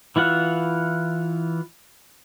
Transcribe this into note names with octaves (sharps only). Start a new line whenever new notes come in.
E3 E4 F4 F#5